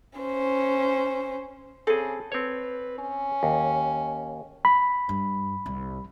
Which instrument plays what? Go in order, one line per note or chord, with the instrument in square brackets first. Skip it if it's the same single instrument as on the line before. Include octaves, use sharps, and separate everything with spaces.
[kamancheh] C#4 C5
[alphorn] C#3 [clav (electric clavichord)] C4 G#4 [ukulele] A4
[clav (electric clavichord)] C4 C#5 [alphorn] B4
[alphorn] C#4
[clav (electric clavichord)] D#2
[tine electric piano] B5
[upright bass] G2
C2